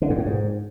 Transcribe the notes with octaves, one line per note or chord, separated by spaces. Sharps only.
D3
G#2
A2
G#2